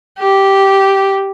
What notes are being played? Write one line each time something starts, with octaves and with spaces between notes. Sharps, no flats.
G4